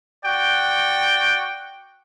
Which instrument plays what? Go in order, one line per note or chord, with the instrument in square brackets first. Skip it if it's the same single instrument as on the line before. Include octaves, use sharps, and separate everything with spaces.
[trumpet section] F#4 D5 G5